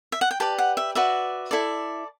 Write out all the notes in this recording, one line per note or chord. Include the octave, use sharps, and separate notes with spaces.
E5
F#5
G5
G4 B4 D5 A5
F#5
E5
F#4 B4 D5 E5
E4 A4 D5